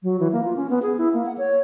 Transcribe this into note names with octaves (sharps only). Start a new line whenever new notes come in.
F#3
E3
A#3
F4
C#4
B3
G#4
E4
A#3
F#5
C#5